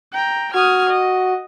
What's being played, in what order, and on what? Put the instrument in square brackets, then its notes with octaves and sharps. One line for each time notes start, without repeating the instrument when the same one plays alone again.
[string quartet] G5 A#5
[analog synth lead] F#4 [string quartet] D#6 F6 G#6
[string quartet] D#5